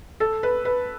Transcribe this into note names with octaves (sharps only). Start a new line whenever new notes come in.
A4
B4
B4